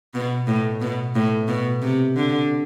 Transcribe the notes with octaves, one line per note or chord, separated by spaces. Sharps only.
B2
A2
B2
A2
B2
C3
D3